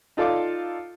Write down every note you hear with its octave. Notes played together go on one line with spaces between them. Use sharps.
D#4 F4 A4 D5 F5 D6